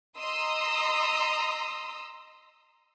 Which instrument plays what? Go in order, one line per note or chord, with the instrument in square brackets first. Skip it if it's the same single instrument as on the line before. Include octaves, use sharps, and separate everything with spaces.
[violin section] D#5 A#5 C6 D#6 E6